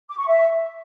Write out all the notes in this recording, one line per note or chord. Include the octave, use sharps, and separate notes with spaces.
D6
C#6
E5